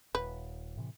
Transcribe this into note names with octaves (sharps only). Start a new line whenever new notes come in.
D#1 B4
A2 C3 E3